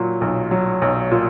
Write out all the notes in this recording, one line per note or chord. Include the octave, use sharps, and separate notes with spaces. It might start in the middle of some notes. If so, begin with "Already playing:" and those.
Already playing: A#2 F#3
B1
F#3
B1
A#2